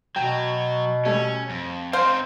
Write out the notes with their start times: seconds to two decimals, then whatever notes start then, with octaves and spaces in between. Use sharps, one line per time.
0.16 B2 F#3 G5
1.05 G3 A3 C#4
1.50 F2
1.93 C4 D#4 C5 F5